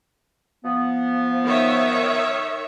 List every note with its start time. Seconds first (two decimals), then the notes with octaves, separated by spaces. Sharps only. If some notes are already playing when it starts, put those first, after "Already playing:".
0.64 F3 B3
1.44 D#3 C#5 E5